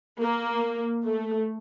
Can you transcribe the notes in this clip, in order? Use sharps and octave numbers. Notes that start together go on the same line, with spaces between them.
A#3
A3